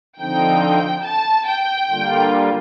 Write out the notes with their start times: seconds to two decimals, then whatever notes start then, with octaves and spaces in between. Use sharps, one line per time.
0.19 D3 F3 C4 D#4 G5
1.04 A5
1.47 G5
1.90 D3 G3 A#3 F4